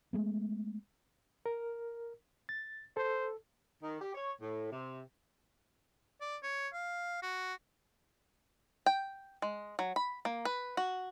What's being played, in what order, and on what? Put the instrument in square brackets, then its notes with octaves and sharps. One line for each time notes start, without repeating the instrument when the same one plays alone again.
[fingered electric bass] G#3 A3 B3
[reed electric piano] A#4
A6
[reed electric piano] A4 [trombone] C5
[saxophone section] D#3
G4
C#5
A2
C3
[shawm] D5
C#5
F5
F#4
[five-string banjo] G5
G#3
F#3
B5
A#3
B4
F#4